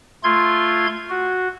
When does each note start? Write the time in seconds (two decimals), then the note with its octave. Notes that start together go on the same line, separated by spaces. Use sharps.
0.24 A3 F4 C6 G#6
1.10 F#4